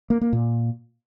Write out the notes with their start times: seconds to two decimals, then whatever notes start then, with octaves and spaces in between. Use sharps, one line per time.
0.10 A#3
0.21 A#3
0.33 A#2